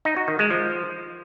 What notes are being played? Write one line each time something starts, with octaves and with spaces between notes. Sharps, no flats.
D#4
F#4
D#3
G#3
F3